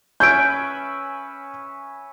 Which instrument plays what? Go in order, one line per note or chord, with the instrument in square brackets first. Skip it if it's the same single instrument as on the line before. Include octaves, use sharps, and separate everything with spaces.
[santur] C#4 B4 E5 [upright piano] G6 D7